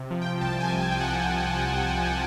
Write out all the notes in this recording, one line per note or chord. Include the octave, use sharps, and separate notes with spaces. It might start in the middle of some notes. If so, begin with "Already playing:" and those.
Already playing: C3
F3
G5
C2 A5
G#5
C2
G5
G5
C3 F#5